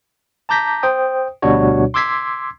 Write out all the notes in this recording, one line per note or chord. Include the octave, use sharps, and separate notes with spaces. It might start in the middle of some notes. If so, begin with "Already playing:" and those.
A5 A#5 D6 G6 A#6 B6
C5 G5 D#6
D2 B2 G3 D4 F#4 C#5
C6 D6 E6 G#6 B6 C7